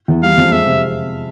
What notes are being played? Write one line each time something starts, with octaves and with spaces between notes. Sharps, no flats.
E2
G3 F5
F2
G#3 E5
C3